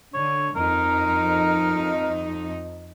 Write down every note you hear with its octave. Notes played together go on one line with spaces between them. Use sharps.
D3 C#5
F2 D#4 A#4